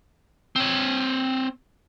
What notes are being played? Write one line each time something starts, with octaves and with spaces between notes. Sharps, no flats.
C4 C#5